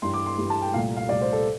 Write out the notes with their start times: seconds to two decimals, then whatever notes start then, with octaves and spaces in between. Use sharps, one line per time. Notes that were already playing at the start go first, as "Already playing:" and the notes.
0.02 G2 E3 G3 C6
0.14 D6
0.26 C6
0.38 G2 E3 G3
0.50 A5
0.62 G5
0.73 C2 A#2 A3 F5
0.97 F5
1.09 C2 A#2 A3 D5
1.21 C5
1.33 A4